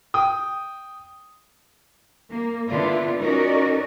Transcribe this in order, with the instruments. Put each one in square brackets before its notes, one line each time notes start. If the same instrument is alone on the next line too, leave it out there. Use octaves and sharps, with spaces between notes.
[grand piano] G5 D#6
[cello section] A#3
D3 B3 D4 E4 F4
C#4 D#4 F#4 A#4 D5